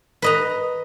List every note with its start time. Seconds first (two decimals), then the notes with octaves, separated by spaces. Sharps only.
0.22 B4 D#5 A#5